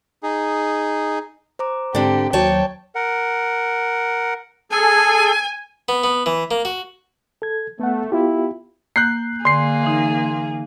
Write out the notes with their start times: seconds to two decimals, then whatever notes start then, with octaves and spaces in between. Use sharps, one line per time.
0.23 D#4 G#4
1.59 C5 A#5 D6
1.95 G#2 D3 C4 D4 G4
2.33 D#2 F#3 C#5 G5 A5
2.95 A#4 F#5
4.72 G#4 A4 G#5
5.89 B3
6.04 B3
6.26 E3
6.51 A#3
6.65 F#4
7.42 A4 G#6
7.80 A3 B3 F#5
8.12 B3 E4 F4 G4
8.96 A#3 F#6 G6 C7
9.45 D3 A#3 G#4 C6 C7
9.83 E3 D#4